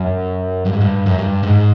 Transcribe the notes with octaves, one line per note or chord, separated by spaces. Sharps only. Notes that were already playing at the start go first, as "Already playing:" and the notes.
Already playing: F#2
G2
G#2
G2
F#2
G2
G#2